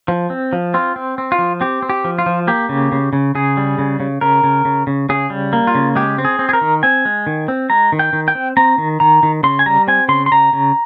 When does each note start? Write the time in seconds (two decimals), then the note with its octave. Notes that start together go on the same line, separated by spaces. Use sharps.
0.08 F3
0.30 C4
0.53 F3
0.74 C4 F4
0.96 C4
1.18 C4
1.32 F4
1.39 F3
1.61 C4 G4
1.83 C4
1.90 G4
2.05 F3
2.19 F4
2.26 F3
2.47 A#3 G4
2.69 C#3
2.92 C#3
3.13 C#3
3.35 C#3 G#4
3.57 G3
3.79 C#3
4.00 C#3
4.21 C#3 A#4
4.44 C#3
4.65 C#3
4.87 C#3
5.09 C#3 G#4
5.30 G3
5.53 A#3
5.67 F4
5.75 C#3
5.95 G#3 G4
6.18 C4
6.25 G#4
6.39 C4
6.49 G#4
6.53 A#4
6.61 D#3
6.83 C4 G#5
7.05 G#3
7.27 D#3
7.48 C4
7.70 G#3 A#5
7.92 D#3
7.99 G5
8.13 D#3
8.28 G5
8.35 C4
8.57 C4 A#5
8.78 D#3
9.00 D#3 A#5
9.23 D#3
9.43 C#3 C6
9.59 G#5
9.66 G3 A#5
9.88 C4 G#5
10.09 C#3 C6
10.26 C6
10.32 C#3 A#5
10.53 C#3